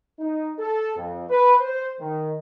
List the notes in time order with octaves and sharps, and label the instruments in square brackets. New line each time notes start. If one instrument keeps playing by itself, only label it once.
[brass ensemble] D#4
A4
F2
B4
C5
D#3